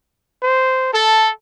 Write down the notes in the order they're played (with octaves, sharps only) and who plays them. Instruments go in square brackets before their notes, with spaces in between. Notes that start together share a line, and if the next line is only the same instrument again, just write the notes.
[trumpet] C5
[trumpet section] A4 [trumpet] A5